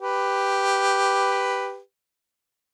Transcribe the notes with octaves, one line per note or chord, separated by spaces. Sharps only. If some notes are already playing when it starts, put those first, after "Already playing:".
G4 B4